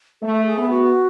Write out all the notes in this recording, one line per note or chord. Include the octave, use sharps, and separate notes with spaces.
A3 A4
G#4
B3
F#4